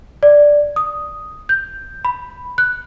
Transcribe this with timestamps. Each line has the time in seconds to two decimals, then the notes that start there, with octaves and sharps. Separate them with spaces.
0.23 D5
0.76 D#6
1.49 G6
2.05 B5
2.58 F#6